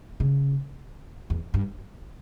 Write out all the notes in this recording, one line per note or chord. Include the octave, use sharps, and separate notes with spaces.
C#3
E2
G2